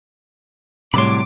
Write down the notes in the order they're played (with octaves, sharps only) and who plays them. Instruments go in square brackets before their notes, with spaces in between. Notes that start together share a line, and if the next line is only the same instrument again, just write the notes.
[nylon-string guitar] A2 F#3 C#5 [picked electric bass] C3 G3 [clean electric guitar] B5 C6 [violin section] D6